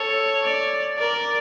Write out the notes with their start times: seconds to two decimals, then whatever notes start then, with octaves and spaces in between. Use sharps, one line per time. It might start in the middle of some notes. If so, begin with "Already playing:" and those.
Already playing: A4 C#5
0.44 D5
0.99 A#4 D5